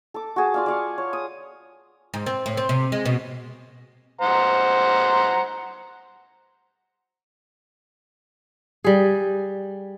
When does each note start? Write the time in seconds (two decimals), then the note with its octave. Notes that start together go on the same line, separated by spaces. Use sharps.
0.14 A4 D6
0.36 F#4 G#4 A5
0.54 F4 D5 F5
0.66 D5 F5 C#6
0.98 C#5
1.13 D#6
2.14 G#2
2.26 C4
2.46 A2
2.57 C4
2.69 C3
2.92 G#3
3.05 B2
4.21 C5 F#5 A#5
8.84 G3 G#4